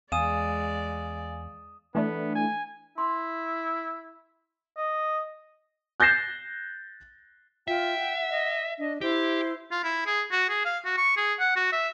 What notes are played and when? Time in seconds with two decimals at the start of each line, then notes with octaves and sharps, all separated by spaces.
0.12 E2 G#3 D5 F5 G#5 D#6 D#7 E7
1.95 E3 A3 B3 D4
2.35 G#5
2.98 E4 C6
4.77 D#5
6.00 F#6 G6 A6 A#6 C7 E7
7.68 F4 E5 G5
7.99 F#5
8.30 D#5
8.78 D4 D#5
9.01 E4 G4 C5
9.71 F4
9.84 E4
10.06 G#4
10.31 F#4
10.49 G#4
10.65 F5
10.85 F#4
10.97 C#6
11.17 G#4
11.39 F#5
11.56 F#4
11.72 E5